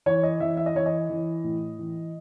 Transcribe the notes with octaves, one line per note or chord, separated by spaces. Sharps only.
E3 C#5
D#5
E3 E5
E5
D#5
E3 C#5
D#5
E3
A2
E3